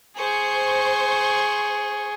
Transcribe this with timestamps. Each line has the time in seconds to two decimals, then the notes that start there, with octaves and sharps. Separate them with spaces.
0.17 G#4 C5 C#6 G6